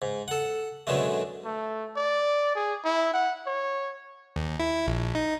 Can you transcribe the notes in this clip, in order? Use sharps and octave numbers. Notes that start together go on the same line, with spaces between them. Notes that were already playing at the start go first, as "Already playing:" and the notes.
G#2
A4 F#5
F#2 B2 D3 G#3 A3
A3
D5
G#4
E4
F#5
C#5
D#2
E4
A#1
D#4